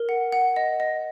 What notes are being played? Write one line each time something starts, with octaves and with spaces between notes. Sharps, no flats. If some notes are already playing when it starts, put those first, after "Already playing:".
Already playing: A#4
F#5
F#5
D#5
D#5